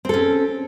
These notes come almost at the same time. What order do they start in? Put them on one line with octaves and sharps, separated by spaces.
C4 A4 C#4